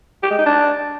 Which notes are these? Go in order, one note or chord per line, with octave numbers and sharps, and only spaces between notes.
G4
G#3
D#4
D4